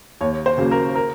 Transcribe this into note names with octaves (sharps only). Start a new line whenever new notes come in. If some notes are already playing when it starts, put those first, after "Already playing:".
D#2 C#5
C5
C#3 F#3 A#3
A#4
A#4